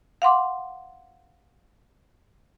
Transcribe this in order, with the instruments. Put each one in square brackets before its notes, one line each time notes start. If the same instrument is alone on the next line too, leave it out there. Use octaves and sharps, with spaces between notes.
[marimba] F5 F#5 C6 D6